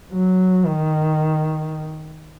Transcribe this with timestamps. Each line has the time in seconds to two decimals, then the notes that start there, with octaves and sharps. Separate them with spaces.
0.13 F#3
0.66 D#3